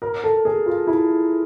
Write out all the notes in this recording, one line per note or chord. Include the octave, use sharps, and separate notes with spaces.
A#4
A4
G#4
F4
E4